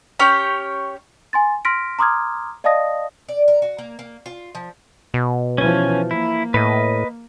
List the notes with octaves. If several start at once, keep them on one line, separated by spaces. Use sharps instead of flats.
C#4 G4 C#5
G#5 C6 A6
C6 F6 A#6 B6 D7
A#5 C6 D6 D#6 F6 G#6
D5 D#5 F5 A5 D#6 A#6
D5
A#4
F#4
A#3
A#3
F4
F3
B2
E3 F3 C#4 G#5
A#3 E4
A2 B4 D#5